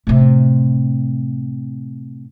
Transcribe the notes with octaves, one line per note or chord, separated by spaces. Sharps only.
A2 C3